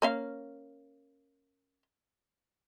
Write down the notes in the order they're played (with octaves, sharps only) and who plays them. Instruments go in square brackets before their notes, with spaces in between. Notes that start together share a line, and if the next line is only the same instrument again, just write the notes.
[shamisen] A#3 C#4 F5